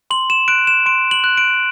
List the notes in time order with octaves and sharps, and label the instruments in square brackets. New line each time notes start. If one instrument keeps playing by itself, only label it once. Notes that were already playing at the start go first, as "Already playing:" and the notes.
[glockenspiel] C6 F#7
E7
F#6 D7
E7
C6 D7
F#7
F#6
D7